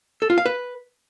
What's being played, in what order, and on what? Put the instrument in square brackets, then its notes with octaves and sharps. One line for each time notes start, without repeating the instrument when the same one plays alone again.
[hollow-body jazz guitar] A4
F4
F5
B4